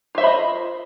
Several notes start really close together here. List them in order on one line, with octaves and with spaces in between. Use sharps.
F4 E5 C5 B5 D#5